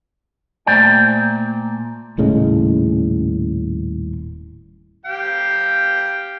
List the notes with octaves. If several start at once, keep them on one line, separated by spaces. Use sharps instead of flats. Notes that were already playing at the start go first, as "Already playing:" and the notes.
A#2 A3 C5 D5 G5 G#5
D#1 A2 C#3 G#3
G4 F5 G5